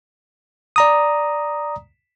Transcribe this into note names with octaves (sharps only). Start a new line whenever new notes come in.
D5 A#5 D#6